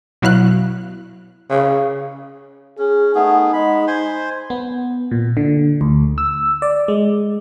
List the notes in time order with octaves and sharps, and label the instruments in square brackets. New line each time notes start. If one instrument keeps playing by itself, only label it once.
[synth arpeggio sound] B2 F#3 E4 F5 F#6
[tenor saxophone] C#3
[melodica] C#4 [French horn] G#4
[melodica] A3 B3 G#4 [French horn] D#4
[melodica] G#3 B5
C5 G#5 C6
[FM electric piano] B3
A#2
D3
D2
E6
D5
G#3